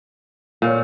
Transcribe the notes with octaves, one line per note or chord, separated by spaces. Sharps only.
A#2 C#5 F5